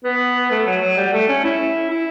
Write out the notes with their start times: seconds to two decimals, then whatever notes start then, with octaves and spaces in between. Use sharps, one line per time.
0.04 B3
0.51 A3
0.67 F#3
0.82 F#3
0.97 G3
1.13 A3
1.28 C#4
1.44 E4
1.91 E4